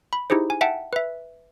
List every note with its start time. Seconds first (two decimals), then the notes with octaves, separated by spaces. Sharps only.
0.13 B5
0.30 D#4 E4 G4 G#4 C5
0.50 G#5
0.61 E5 F#5 G5 A5
0.93 B4 E5